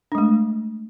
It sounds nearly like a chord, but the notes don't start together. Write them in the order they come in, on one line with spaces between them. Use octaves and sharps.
D4 G#3 A3